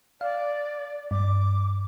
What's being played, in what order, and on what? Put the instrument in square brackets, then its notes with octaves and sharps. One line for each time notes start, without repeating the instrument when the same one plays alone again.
[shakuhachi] D5 [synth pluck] F5
[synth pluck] G2 [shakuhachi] D6